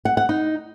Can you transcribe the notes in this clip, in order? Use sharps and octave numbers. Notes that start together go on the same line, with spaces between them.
F#5
F#5
D#4